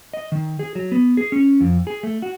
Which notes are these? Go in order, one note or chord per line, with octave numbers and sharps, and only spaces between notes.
D#5
D#3
G#4
F#3
B3
G#4
C#4
F2
G#4
A3
F#4